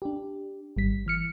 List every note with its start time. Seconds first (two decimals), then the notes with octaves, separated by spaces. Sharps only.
0.02 D4 G4
0.76 G#1 G3 B6
1.06 E3 F6 C#7